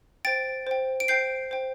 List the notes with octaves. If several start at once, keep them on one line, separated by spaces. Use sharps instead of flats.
C5 G5 A6 D7
C5 G5
D7
C5 G5 G6 C7
C5 G5